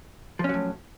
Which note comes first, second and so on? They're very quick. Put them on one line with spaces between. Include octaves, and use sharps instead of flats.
F3 C#4 F#3 A2